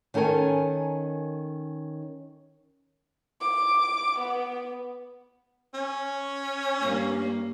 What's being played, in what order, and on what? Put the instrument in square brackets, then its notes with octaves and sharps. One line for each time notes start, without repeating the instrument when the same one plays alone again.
[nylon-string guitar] D#3 C#4 A4 A#4 G#5
[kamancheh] D6
B3
[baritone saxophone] C#4
[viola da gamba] G2 A#3